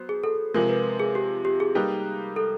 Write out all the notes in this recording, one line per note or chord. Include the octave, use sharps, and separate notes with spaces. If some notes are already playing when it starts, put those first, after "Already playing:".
Already playing: F#3 B3 C5
G#4
A4
C3 F3 G#3 A#4
B4
G#4
G4
G4
G#4
G3 A#3 D#4 G4 B4
A4